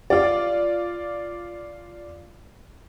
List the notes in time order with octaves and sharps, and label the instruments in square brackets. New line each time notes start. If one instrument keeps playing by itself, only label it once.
[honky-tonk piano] F4 D5